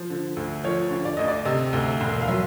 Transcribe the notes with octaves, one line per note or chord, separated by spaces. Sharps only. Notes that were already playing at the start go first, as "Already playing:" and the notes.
Already playing: F3 C5
D3
D2
F3 C#5
D3
D5
D2 D#5
D5
C3 D#5
D2
E1
F5
F#3 E5